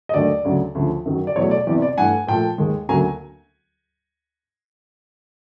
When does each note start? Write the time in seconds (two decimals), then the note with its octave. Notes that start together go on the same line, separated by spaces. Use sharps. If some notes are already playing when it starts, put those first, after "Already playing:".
0.09 D#5
0.14 D#2 D3 F#3 A3 D5
0.45 D2 C#3 F#3
0.75 D2 C#3 F3
1.06 F#2 D#3 F#3
1.27 D5
1.36 E2 B2 F#3 A3 C#5
1.51 D5
1.67 E2 C3 E3 D5
1.82 D5
1.97 G2 E3 A3 F#5 G#5
2.27 A#2 F3 A3 G5 A5
2.58 D#2 D#3 G#3
2.89 D2 C#3 F#3 A#3 G#5 A#5